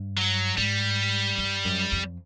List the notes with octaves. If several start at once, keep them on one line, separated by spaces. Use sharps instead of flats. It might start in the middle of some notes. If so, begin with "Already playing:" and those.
Already playing: G2
F#3
G#2 G3
G2
F#2
F2